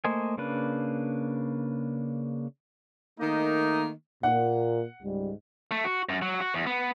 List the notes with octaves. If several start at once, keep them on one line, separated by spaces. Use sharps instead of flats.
A3 A#3 C5 D#5 G#5
C#3 A#3 D4 B4
D#3 A3 A#3 D#4
A#2 F#5
C#2 G#2 G3
A3
F#4
F#2
F#3
F#4
E2
B3